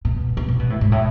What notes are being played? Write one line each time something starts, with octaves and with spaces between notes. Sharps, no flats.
B2
B2
C3
B2
A2
G#2
A2